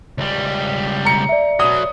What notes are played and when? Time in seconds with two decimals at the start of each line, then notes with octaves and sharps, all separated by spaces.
0.18 C#2 G3
1.05 A#5 C#7
1.29 D5 E5
1.60 B2 F#3 D#6